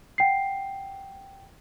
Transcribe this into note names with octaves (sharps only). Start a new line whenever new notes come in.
F#5 G5 C7